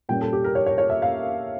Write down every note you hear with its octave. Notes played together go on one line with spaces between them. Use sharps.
A#2 G3 C#4 G5
A4
G4
A#4
C#5
C#5
C#5
E5
F5